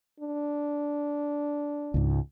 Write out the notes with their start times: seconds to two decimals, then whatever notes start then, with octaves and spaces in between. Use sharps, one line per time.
0.20 D4
1.94 C#2 G#2